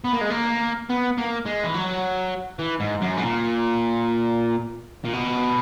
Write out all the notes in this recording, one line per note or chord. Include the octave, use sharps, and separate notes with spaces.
B3
A#3
G#3
A#3
B3
A#3
G#3
E3
F#3
E3
G#2
F#2
G#2
A#2
A#2
B2